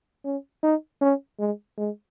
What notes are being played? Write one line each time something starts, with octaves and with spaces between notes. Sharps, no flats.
C#4
D#4
C#4
G#3
G#3